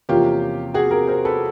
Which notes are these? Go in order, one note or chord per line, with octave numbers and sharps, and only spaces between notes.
E2 C3 F3 A#3 C#4 F4 G4
F#4 G#4
G#4 A#4
A#4 C5
A4 B4